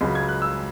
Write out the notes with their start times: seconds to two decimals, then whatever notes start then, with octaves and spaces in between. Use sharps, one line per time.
0.01 C#2 C#3 F#3 B5
0.15 G#6
0.28 F#6
0.42 E6